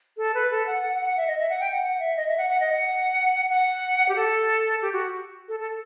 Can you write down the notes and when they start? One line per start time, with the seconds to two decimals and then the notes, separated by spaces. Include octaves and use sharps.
0.17 A4
0.34 B4
0.50 A4
0.67 F#5
0.83 F#5
0.95 F#5
1.06 F#5
1.17 E5
1.27 D#5
1.39 E5
1.50 F#5
1.60 G5
1.71 F#5
1.83 F#5
2.00 E5
2.17 D#5
2.28 E5
2.38 F#5
2.50 F#5
2.60 D#5
2.72 F#5
3.49 F#5
4.09 G4
4.16 A4
4.82 G4
4.93 F#4
5.48 A4
5.60 A4